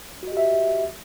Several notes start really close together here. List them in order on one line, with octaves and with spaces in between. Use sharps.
F#4 D#5 G4 E5